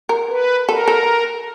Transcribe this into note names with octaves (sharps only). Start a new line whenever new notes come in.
A#4
B4
A4 A#4
A4